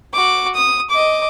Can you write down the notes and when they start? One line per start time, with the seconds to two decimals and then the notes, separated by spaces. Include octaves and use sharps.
0.13 F#4 D6
0.55 D#6
0.90 D#5 D6